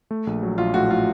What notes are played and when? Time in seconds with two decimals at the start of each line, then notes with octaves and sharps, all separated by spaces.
0.11 A3
0.27 A#1
0.43 F#3
0.58 A#1 F4
0.74 A2 F#4
0.90 A3 F4